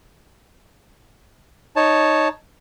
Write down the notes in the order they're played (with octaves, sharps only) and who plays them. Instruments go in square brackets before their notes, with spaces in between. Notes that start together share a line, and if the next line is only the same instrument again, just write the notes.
[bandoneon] D#4 C#5 A5